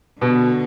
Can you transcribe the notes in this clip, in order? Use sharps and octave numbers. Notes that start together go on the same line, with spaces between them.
B2 D3